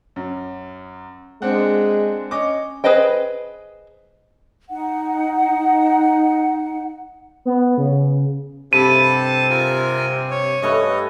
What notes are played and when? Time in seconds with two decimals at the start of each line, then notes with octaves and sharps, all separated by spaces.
0.16 F#2
1.42 G#3 C4 D4 F#5
2.31 C#4 D#5 D6
2.84 G#4 B4 C5 D#5 G5
4.70 D#4 F#5
7.45 B3
7.78 C#3
8.73 G2 C3 A4 A5 B5 D#7
9.50 F4 A#4 G#5
10.30 C#5
10.62 G2 A3 C#4 B4 C#5 D#5